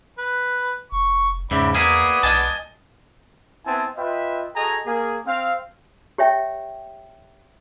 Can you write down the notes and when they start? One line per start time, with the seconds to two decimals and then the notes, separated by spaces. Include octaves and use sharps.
0.19 B4
0.92 F1 C#6
1.51 E2 G#2 C#3 D5 E5 B5
1.74 A#3 B3 E4 G#4 D5 D#6
2.23 B1 D#5 G#5 A5
3.66 B3 C4 E4 G#5 A5
3.96 F4 B4 D#5 E5 G5
4.55 F#4 G#4 A4 D#5 G#5 A#5
4.85 A#3 G#4
5.26 C4 F5
6.18 G4 C#5 E5 G5